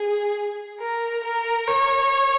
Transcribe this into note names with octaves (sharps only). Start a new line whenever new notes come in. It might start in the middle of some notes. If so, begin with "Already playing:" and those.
Already playing: G#4
A#4
A#4
C#5